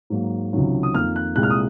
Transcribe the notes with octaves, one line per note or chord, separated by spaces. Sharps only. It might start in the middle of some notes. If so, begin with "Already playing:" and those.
G#2 F#3 A#3
C#2 C3 D#3 F#3
D#6
F2 D#3 A#3 F6
F#6
C2 A#2 G#3 F#6
F6
D#6